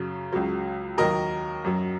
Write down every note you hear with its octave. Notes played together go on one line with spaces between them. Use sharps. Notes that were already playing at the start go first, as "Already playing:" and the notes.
Already playing: F#2 C#3 F#3
C#2 C#3 F#3
D#2 D#3 F#3 A#4 D#5
F#2 F#3